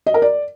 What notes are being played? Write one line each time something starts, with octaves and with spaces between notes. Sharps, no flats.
D#5
A#4
D5